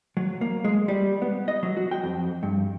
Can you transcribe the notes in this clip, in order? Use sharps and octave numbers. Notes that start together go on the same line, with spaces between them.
F#3
A#3
G#3
G3
B3
D#5
F#3
F#4
G5
F2
G2